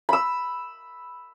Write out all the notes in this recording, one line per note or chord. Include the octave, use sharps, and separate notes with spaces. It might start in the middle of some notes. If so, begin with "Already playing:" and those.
B5 E6